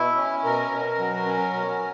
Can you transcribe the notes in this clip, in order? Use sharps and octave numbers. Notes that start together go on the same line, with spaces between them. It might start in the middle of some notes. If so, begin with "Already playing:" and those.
Already playing: B2 E4
C#4
B2 A#4
B2
F#3
C#4
B2